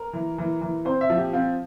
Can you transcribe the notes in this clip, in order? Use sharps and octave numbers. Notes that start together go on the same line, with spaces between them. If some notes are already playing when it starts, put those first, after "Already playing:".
Already playing: A#4
E3
E3
E3
C4 C5
E5
F3
G4
C4 F4